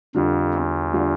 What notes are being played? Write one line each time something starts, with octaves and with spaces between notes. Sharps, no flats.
F2 D3 G3 D4 F4
E2
D3 G3 D4 F4